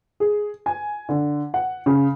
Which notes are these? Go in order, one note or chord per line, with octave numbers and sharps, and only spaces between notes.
G#4
G#5
D3
F#5
C#3